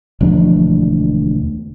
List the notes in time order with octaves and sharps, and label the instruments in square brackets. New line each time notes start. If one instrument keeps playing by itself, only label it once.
[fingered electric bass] E1 D2 F3 D4